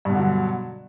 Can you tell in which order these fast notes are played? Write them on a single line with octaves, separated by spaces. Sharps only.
G2 B2 D3 F#3